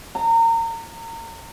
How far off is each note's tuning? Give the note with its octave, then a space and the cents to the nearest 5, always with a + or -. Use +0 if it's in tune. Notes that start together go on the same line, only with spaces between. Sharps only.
A#5 -30